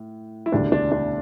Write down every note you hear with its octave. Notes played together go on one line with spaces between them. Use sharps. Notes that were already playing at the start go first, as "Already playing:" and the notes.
Already playing: A2
E4
E1 D2 C#3 G3 D4
D4
D4